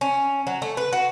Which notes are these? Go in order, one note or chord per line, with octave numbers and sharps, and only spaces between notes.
C#4
F#3
A3
B4
F#4